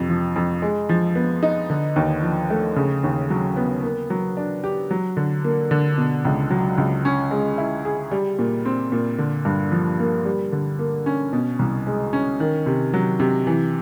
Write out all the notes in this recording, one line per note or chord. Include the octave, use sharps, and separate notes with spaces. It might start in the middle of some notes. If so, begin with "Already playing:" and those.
Already playing: F2 C3
F3
F2
G#3
F3
B3
D#4
D3
D#2
F3
A3
C#3
D#2
F#3
B3
A#3
F#3
D4
G4
F#3
D3
A#3
D3
B2
C#2
F#3
C#2
C#4
G#3
E4
G#4
G3
A#2
C4
A#2
D3
G2
F3
A#3
G3
D3
A#3
C#4
B2
C2
G#3
C#4
D#3
C3
F#3
C3
E3